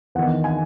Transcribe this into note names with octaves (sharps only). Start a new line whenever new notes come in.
E2 D#3 F#5
G#5